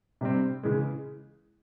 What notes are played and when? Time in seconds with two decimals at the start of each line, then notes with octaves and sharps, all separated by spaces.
0.21 C3 G3 C4
0.63 C#3 E3 G#3